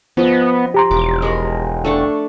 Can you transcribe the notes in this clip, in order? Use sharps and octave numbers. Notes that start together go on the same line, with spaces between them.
F3 B3 D#5
G4 A#5 C6
E1 D6
G#3 A#4 B5
A3 D4 C#6